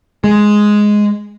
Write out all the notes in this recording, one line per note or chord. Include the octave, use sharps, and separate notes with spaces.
G#3